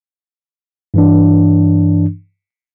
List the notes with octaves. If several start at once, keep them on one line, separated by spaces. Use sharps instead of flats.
G2 E3 D4